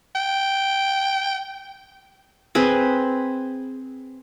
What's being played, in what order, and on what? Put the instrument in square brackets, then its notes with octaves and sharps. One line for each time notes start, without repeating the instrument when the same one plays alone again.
[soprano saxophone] G5
[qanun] C4 G#4 B4